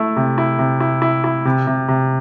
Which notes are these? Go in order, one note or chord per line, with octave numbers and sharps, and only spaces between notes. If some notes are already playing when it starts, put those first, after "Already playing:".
Already playing: A3 E4
C3
E4
C3
E4
E4
E4
C3
C3
C3